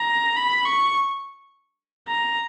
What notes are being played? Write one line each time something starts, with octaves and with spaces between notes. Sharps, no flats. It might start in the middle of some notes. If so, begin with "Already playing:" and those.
Already playing: A#5
B5
C#6
A#5